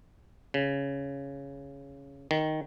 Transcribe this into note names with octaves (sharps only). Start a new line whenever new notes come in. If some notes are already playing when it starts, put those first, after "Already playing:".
C#3
D#3